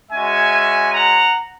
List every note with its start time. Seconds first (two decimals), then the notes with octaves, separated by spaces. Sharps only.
0.11 G#3 C#4 F#4 E5 G#5
0.93 F#5 A#5